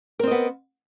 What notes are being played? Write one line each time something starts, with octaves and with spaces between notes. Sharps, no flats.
B3 C4 A#4 D#5